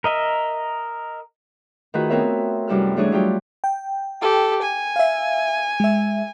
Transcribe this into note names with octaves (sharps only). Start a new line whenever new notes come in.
A#4 D#5 E5
D#3 A3 F4 F#4 G#4 B4
A3 B3 C4 A#4 C#5 E5
F#2 C3 G3 E4 A4 F6
E3 G3 A3 D4 G#4 C#5
F#3 G3 F4 G4 C#5
G5
G4 A4
G#5
E5 F5
G#3 E5